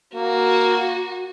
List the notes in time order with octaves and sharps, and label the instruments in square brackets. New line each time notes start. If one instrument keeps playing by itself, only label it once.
[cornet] A#3 [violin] F#4